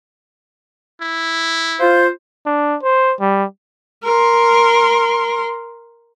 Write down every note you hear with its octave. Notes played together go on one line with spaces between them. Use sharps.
E4
F4 C5
D4
C5
G3
A#4 C6